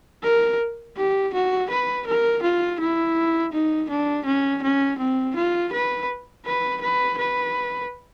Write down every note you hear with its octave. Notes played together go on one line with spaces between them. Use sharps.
A#4
G4
F#4
B4
A#4
F4
E4
D#4
D4
C#4
C#4
C4
F4
B4
B4
B4
B4